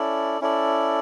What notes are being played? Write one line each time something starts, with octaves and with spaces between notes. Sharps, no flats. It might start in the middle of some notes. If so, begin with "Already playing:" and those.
Already playing: C#4 E4 A4 D5
C#4 E4 A4 D5